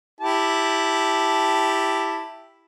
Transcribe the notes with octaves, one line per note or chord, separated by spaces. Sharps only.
E4 G4 A5